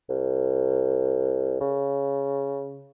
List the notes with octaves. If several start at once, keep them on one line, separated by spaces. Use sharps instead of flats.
C2
C#3